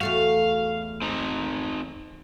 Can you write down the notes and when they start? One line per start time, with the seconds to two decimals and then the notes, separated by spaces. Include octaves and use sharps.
0.01 E2 A3 F#4 F5
1.02 C4 D#4